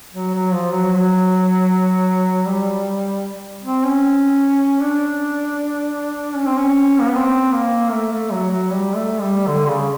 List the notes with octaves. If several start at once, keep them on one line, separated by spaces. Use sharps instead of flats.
F#3
F#3
F3
F#3
F#3
G3
C4
C#4
D4
C#4
C4
C#4
A#3
B3
C4
A#3
A3
A3
F#3
F#3
G3
A3
G3
D3
C#3